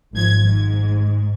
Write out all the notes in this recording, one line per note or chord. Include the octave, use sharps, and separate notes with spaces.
G#1 F3 G#6
G#2